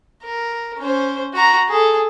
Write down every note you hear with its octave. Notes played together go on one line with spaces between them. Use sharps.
A#4
C#4 C5
F#4 A#5
G#4 A4